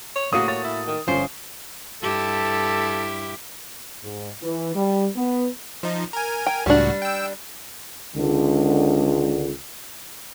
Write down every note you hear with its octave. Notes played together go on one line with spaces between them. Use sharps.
C#5
A2 C#3 A#3 F#4 D#6 D#7
C#5 A6
E4
D#3
G1 F3 C#4 C5
G2 E4 G4 A4
G#2
E3
G3
B3
F3 D#4
A#4 G#5
G5
C#2 A2 G3 D4 F#4
G5 E6
C#2 D3